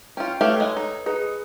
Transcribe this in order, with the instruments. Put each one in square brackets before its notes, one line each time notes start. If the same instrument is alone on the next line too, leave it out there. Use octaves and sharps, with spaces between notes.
[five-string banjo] C#4 F4 [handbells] G5
[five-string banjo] A3 G4 F5 [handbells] A4 B4 C#5
[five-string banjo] G#3 G#5
D#4
[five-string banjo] D#4 [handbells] G#4 B4